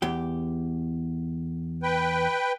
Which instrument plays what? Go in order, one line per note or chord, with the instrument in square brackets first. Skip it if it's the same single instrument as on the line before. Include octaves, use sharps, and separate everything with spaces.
[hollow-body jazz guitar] E2 G4
[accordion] B4 G5